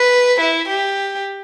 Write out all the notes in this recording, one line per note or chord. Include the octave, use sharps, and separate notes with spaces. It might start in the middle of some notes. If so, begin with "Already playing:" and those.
Already playing: B4
E4
G4